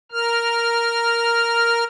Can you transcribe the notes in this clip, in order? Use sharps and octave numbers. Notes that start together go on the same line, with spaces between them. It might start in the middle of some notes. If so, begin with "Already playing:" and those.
A#4 F6